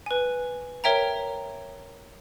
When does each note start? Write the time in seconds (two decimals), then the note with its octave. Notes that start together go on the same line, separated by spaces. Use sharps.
0.06 B4 G#5
0.84 A#4 C#5 E5 G5 A#5